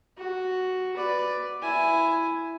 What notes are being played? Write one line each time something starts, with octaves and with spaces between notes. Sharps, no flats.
F#4
B4 D5
E4 G#5